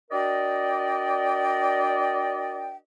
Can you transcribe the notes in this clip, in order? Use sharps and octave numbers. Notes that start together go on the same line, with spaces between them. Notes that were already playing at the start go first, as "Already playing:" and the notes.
D4 F#4 A#4 D5 D#5 G5